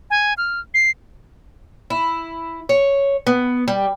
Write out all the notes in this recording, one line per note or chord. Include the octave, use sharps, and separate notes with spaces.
G#5
F6
C7
E4
C#5
B3
G3